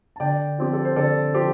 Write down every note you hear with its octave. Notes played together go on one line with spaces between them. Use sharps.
A5
D3 D5 G5
F3 C4 G4
A4
C5
D3 A4 D5
F3 G4 C5